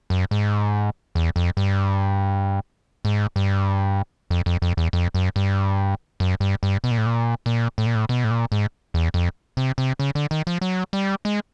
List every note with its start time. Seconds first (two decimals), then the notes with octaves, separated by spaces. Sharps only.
0.10 F#2
0.31 G#2
1.15 E2
1.36 F2
1.57 G2
3.05 G#2
3.36 G2
4.31 F2
4.46 F2
4.62 F2
4.77 E2
4.93 F2
5.15 F#2
5.36 G2
6.20 F#2
6.40 G2
6.63 G2
6.84 B2
6.91 A#2
6.98 A2
7.06 A#2
7.46 A#2
7.78 A2
7.86 A#2
7.95 A2
8.09 B2
8.24 A2
8.31 A#2
8.52 G#2
8.94 E2
9.14 F2
9.57 C3
9.78 C3
10.00 C#3
10.15 D3
10.31 D#3
10.47 F3
10.61 F#3
10.93 G3
11.25 G#3